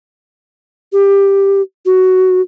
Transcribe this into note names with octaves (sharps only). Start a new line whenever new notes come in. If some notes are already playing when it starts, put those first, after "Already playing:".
G4
F#4